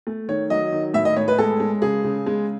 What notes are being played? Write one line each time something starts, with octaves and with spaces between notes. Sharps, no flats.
A3
D#3 C#5
F#3 D#5
D#3
A2 E5
D#5
A2 C#5
B4
G#3 A4
G#3
C#3 G#4
C#3
G#3